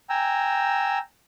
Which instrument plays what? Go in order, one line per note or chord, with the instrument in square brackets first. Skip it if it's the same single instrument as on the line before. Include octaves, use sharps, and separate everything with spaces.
[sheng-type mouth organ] G5 G#5 A#5 E6